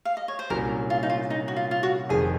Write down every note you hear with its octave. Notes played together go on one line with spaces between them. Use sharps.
F5
D#5
C#5
C5
C2 A#2 F#3 C#4 A#4
F4
D#4
F4
D#4
F#4
F4
F4
F#4
F1 F2 D#3 G#4